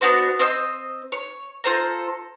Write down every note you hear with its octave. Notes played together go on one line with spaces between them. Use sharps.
B3 D4 F#4 C5
C4 C5 D#5 E6
C#5
F4 A4 C5 A#5